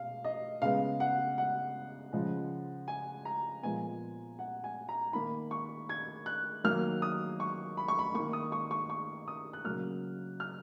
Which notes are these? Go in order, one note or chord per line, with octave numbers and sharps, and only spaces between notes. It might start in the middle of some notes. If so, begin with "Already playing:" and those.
Already playing: B2 F5
D#5
C#3 G#3 B3 F5
F#5
F#5
C#3 F3 G#3
G#5
A#5
A#2 F3 G#3 B3 G#5
F#5
G#5
A#5
D#3 A#3 B5
C#6
G#6
F#6
D#3 F#3 A#3 F6
D#6
C#6
B5
C#6
B5
D#3 A#3 C#6
D#6
C#6
C#6
C#6
D#6
F#6
C#3 F#3 A#3 F6
F6